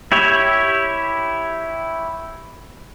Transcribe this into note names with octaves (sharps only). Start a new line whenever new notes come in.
E4 G4 C#5 E5